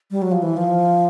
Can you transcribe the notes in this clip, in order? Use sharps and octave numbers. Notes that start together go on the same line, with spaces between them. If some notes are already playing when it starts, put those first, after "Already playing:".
G3
F#3
F3
E3
F3